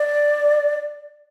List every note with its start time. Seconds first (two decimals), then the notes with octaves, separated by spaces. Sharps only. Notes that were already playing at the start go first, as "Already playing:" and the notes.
Already playing: D5